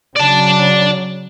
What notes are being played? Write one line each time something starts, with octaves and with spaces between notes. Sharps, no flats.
C#3 F#3 D5 A5